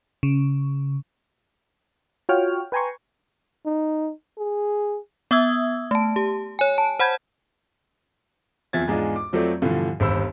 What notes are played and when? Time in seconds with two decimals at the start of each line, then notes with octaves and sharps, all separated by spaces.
0.23 C#3
2.29 F4 F#4 C#5 G5 F6
2.72 B4 G5 G#5 A#5 C6 C#6
3.66 D#4
4.38 G#4
5.31 B3 E5 D#6 E6 G#6
5.91 A3 A5
6.16 G4
6.59 C#5 G#5
6.78 A5
6.99 C5 F#5 B5 G6 G#6
8.73 E2 F3 C4 E5 G#6 A6
8.87 E2 G#2 G#3 D4 F4 D#5
9.16 D6
9.33 F2 F3 F#3 A3 C4 D5
9.62 G2 B2 D3 E3 F3
10.00 G1 D#2 C5 B5 E6